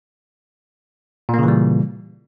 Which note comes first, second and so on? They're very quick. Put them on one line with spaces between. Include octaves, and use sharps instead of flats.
A#2 A#3 C#3 E3 G3